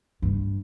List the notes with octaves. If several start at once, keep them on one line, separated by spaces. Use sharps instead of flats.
G2